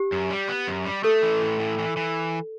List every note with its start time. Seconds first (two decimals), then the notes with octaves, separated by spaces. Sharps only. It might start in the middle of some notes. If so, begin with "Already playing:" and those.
Already playing: G4
0.12 F#2
0.30 G3
0.49 B3
0.68 F#2
0.86 G3
1.04 A3 A4
1.23 E3
1.42 A2
1.60 E3
1.78 E3
1.97 E3